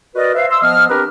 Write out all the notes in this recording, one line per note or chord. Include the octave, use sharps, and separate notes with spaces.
F#4 A#4 B4 D5 D#5
B4 C5 E5 F5
C6 E6
F3 B3 D#5 F6
C4 D4 G4 A#4 B4